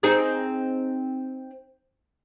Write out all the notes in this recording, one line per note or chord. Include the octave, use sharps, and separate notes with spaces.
C4 D#4 G#4